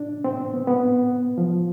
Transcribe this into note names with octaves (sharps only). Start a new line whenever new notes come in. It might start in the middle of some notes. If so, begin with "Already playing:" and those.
Already playing: D4
C4
B3
B3
F3